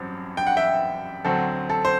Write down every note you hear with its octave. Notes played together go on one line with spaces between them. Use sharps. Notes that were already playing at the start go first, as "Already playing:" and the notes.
Already playing: A1 G2 F#3 C4
G5
F#5
E5 G5
D2 D3 F#3 C4 A4
A4
C5